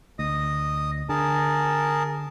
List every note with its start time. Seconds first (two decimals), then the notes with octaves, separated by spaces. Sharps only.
0.19 D2 D#5 D#6
1.09 D3 G#4 A#4 A5